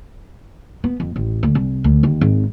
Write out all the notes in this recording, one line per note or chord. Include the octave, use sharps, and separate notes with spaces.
B3
F2
A1
D2
C2
D2
D#2
G#1